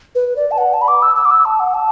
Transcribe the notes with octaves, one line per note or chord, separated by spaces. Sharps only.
B4
D5
A5
F#5
A5
B5
D6
E6
E6
D6
E6
A5
F#5
A5